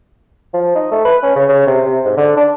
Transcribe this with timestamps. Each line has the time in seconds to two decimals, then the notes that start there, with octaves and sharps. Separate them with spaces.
0.54 F3
0.76 D#4
0.92 A3
1.05 B4
1.23 C#4
1.36 C#3
1.49 C#3
1.67 C3
1.86 C3
2.05 G#2
2.17 D3
2.37 D4